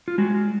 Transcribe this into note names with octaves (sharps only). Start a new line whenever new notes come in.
F4
G#3 F#4